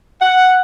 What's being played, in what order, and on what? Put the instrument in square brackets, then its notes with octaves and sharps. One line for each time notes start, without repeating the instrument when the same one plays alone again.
[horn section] F#5